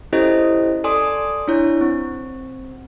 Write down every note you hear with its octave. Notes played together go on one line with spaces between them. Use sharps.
C#4 E4 G4 A4 C5 D#5
A4 D5 G#5 C6 D#6
D4 E4 C#5
C4